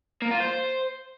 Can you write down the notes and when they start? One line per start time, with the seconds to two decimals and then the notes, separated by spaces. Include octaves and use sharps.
0.22 A#3
0.31 F4
0.41 C5